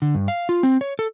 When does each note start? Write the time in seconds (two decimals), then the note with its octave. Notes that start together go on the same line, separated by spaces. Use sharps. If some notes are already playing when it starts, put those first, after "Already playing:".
0.02 D3
0.15 G2
0.28 F5
0.49 F4
0.63 C4
0.81 C#5
0.99 A4